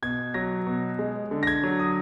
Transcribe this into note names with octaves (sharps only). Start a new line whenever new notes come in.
B2 G#6
F#3 A#6
B2
G#3
D3
A#6
G#6
F#3
D#6